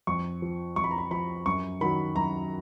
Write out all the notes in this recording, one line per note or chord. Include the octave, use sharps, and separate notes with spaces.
F2 C#6
F3
F2 C#6
B5
A#5
B5
F3 B5
F#2 C#6
D#3 F#3 B5
F#2 A#5